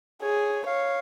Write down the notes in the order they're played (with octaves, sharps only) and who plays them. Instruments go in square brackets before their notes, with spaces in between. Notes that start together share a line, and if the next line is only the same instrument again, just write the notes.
[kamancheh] G#4 [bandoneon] C#5
[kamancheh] C#5 [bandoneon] F5